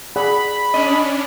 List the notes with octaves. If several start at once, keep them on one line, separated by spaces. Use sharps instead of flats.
G#4 D5 F#5 B5
C#4 D4 D#5